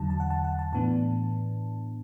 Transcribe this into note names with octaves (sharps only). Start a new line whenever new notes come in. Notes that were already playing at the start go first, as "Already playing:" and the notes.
Already playing: E2 D3 F#3 A5
A5
F#5
A5
F#5
A5
A2 E3 B3 D4 A5